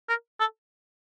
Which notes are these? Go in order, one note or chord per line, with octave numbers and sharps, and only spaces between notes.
A#4
A4